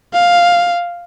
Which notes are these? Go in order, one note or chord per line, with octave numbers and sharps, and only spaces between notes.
F5